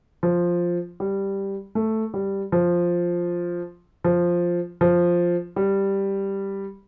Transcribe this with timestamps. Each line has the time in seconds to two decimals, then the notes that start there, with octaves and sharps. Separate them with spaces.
0.23 F3
1.00 G3
1.75 A3
2.14 G3
2.52 F3
4.04 F3
4.81 F3
5.56 G3